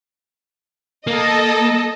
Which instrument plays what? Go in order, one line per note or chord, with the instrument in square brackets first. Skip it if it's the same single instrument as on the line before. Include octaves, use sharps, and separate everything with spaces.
[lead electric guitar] A#3 [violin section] A4 D#5